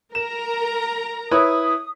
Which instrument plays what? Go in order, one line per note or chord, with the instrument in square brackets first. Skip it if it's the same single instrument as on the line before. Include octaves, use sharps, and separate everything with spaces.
[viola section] A#4 A#5 [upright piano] E7
[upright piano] E4 B4 C#5 [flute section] D#6